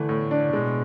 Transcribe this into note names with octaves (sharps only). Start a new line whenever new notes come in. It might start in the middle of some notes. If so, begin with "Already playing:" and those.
Already playing: D3 E3 A3
A2
D4
B2 G#3